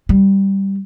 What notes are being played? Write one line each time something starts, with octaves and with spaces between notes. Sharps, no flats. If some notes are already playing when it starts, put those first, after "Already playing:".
G3